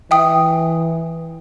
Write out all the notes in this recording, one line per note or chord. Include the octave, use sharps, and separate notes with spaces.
E3 E5 G5 D#6